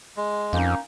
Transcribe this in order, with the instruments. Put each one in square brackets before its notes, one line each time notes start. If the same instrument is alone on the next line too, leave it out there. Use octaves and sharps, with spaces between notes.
[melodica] G#3
[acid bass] F2 [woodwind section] A#3 C#4 D#4